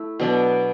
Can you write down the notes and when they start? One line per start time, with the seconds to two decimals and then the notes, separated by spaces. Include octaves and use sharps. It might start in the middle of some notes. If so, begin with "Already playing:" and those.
Already playing: A3 E4
0.20 B2 F#3 B3 D4